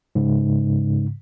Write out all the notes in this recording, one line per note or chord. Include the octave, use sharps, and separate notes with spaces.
G#2 C#3